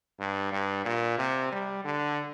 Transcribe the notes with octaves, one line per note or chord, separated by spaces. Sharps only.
G2
G2
A#2
C3
G3
D3